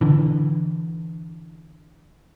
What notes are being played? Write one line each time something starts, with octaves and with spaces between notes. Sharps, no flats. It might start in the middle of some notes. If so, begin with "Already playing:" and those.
D3 E3